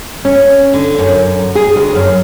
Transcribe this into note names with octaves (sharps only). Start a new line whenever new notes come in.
C#4
D3
F#2
G#4
D2
F#2